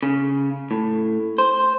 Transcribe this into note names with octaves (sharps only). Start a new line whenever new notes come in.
C#3
A2
C5